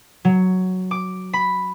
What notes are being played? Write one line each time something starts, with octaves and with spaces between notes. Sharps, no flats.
F#3
D6
B5